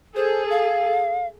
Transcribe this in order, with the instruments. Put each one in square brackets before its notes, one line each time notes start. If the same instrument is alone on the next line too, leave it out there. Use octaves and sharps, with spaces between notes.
[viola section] G#4 A4 [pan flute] C5
[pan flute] F5